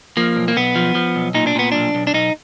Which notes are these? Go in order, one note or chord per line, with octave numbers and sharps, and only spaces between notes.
F3 A#3
B1
A#3
B1 B3
F3
F3
B1
A#2 D#4
D4
A#2 B3
B1 D4
B1
D4
B1 D#4